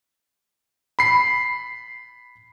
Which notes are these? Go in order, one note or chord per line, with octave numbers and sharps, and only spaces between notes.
B5 C7